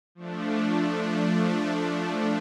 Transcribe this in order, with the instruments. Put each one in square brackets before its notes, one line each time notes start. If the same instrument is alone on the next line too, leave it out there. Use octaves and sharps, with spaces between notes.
[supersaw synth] F3 A3 D4